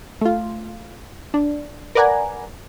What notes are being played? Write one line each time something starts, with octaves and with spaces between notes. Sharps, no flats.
A3 F4
D4
A#4 B4 D5 F#5 G#5 A#5